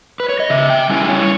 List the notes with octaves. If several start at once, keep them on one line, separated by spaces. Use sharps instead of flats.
B4
C#5
D#5
C#3 E5
G5
G3 C#4 E4 G#5
C#5